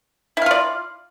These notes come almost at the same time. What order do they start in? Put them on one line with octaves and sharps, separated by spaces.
E4 F5 F4 D5